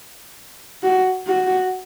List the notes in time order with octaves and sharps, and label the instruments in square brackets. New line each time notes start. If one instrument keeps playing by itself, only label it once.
[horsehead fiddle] F#4
F#4